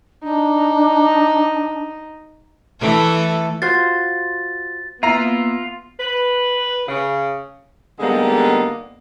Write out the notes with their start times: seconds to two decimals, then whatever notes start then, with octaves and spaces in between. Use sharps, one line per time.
0.23 D4 D#4
2.80 E3 A3 A4
3.62 F4 F#4 C5 A6
5.03 A#3 B3 E4 F4 A#5
5.99 B4
6.87 C#3
8.00 D3 G3 G#3 A#3 B3 D#4